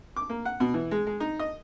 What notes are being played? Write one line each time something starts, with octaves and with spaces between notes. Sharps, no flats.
D6
A#3
F#5
B2
E3
G#3
G#3
D#4
D#5